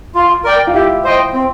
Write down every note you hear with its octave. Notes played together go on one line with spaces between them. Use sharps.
F4
A#4 D5 G5
F4
E4 G4
C5 D#5 G5
C4